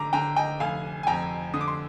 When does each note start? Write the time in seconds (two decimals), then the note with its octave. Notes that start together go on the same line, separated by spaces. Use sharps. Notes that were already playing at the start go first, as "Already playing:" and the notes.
Already playing: G#1 D3 A#5 D6
0.13 D3 G5 A#5
0.36 D#5 G5
0.60 F1 F5 G#5
1.03 G#5
1.07 F2 G5 A#5
1.54 D3 D#6
1.61 D6
1.68 C6